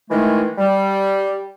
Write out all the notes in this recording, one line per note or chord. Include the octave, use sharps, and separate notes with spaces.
D#3 E3 G#3 A3
G3